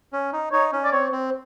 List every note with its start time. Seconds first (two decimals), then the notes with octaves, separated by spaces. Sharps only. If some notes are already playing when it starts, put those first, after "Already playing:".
0.13 C#4
0.33 D#4
0.52 D#4 C#5
0.73 C#4
0.84 D5
0.92 C4 C#5
1.12 C4